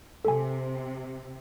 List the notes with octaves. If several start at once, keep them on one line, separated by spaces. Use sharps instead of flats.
C3 A4 G#5